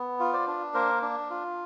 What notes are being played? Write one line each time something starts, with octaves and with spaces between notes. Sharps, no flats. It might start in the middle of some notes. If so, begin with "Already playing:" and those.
Already playing: B3
F4
C5 D5
D4
A#3 A#4 C5
D4
F4